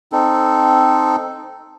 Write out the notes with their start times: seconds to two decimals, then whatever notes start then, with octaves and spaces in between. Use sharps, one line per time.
0.12 C4 D#4 A4